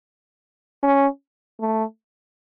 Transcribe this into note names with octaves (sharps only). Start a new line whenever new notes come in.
C#4
A3